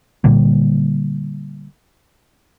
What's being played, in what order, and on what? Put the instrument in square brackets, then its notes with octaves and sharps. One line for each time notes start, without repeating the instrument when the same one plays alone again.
[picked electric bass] A#2 D3 G3 A#3